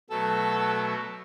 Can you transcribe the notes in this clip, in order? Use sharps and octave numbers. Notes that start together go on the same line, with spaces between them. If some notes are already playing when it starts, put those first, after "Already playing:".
B2 F#3 A3 A4